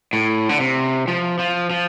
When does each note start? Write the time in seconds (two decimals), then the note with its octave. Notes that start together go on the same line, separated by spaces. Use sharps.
0.13 A2
0.49 D3
0.60 C3
1.08 F3
1.39 F3
1.70 F3